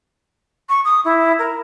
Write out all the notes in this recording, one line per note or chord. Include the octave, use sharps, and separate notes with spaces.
C#6
D#6
E4
A#4